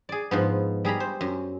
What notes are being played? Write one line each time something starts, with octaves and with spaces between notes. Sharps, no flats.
G#4 D5
G#2 F3 B3
G3 G#4 A#5 B5
C5
F#2